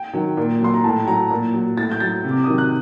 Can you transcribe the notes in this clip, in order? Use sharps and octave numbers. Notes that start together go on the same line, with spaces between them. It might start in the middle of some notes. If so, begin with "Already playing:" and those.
Already playing: G5
D#3 F#3
A#2
F#3 C6
A#5
A2 A5
F#3 A#5
A#2
F#3
A2 A6
G6
F#3 A6
C3
D6
D#3 F#3 D#6
F#6